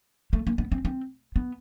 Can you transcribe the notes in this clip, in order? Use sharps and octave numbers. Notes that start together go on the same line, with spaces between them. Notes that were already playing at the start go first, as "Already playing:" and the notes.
A3
A#3
B3
C4
C4
B3